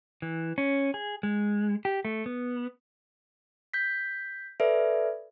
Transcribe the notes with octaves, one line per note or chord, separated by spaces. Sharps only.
E3
C#4
G#4
G#3
G4
A3
B3
G6 B6
A4 B4 D5 E5